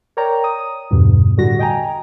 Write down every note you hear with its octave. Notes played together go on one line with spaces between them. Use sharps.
A#4 C#5 D5 G5 A#5
D#6
E2 G2 B2 D3
A2 D3 G3 F#4 A#6
D#5 G5 G#5 A#5